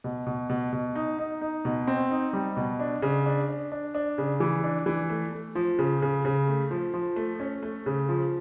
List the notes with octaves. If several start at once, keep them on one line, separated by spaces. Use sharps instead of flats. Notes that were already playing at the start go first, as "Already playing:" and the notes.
B2
B2
B2
B2
D#4
D#4
D#4
B2
C4
D#4
G3
B2
D4
C#3
D4
D4
D4
D4
C#3
E3
D4
E3
A3
A3
F3
C#3
C#3
C#3
A3
F3
F3
A3
C#4
A3
C#3
F3